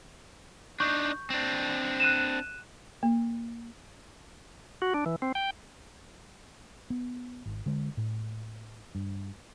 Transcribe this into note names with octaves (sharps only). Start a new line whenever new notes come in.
D4 D#4 C#6 G6
C4 D4
F#6 D#7 E7
A#3
F#4
D4
E3
C4
G5
B3
G#1
D3 G#3
A2
G2